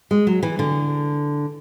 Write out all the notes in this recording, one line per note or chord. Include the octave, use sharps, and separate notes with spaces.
G#3
F#3
E3
D3